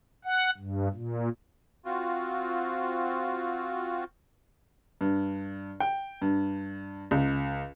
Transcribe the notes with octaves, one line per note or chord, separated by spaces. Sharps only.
F#5
G2
A#2
C4 F4 F#4
G2
G5
G2
C#2